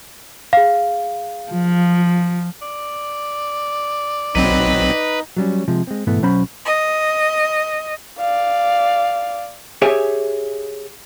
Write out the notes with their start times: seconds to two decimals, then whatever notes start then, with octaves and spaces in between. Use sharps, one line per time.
0.53 G#4 F5
1.51 F3
2.62 D5
4.35 B1 F#3 C4 D#4 B4 D#5 A#5
5.37 F#3 G3 C#4
5.68 C3 F3 G#3
5.87 G#3 C4
6.07 G#2 B2 E3 A3 B3
6.22 B1 F#3 C#4 C5 B5
6.65 D#5
8.18 D5 F5
9.82 G4 G#4 C#5 E5 G#5